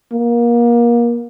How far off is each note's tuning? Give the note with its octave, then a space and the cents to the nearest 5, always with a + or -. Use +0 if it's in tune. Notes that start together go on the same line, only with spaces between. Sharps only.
A#3 +30